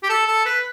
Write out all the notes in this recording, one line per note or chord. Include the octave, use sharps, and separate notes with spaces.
G4
A4
A4
B4